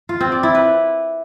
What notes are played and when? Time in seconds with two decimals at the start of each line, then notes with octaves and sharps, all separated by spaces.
0.09 F4
0.21 C4
0.32 D5
0.43 E4
0.55 B4